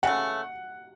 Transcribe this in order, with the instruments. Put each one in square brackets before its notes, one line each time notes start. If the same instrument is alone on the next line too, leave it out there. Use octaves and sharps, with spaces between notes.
[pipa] C#3 E3 A3 [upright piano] F#5